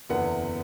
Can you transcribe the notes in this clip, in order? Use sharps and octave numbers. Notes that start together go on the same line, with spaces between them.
F#1 E2 D3 B3 E4 F#5